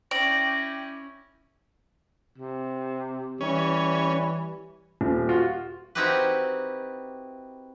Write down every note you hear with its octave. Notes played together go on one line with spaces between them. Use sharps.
C#4 E4 D5 G5 A#6
C3
E3 G3 C#4
D#1
F4 F#4
C4 D#4 E4 F#4 G4 B4